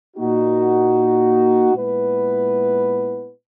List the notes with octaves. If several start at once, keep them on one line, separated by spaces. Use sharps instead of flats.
A#2 A#3 D#4 F#4
A#2 G#3 B3 E4 B4